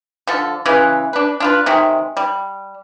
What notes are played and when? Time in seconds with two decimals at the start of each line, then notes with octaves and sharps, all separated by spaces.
0.27 D3 F3 A4
0.66 C#3 E3 G#3 B4
1.13 D4 B4
1.40 D4 F4 B4
1.66 C3 D#3 G#3
2.17 G3